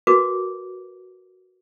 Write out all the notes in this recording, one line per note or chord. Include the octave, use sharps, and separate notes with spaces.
F#4 A#4 B4 D6